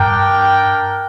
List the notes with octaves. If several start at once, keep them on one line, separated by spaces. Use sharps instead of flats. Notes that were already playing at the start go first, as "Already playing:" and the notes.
Already playing: G2 D4 A#4 G5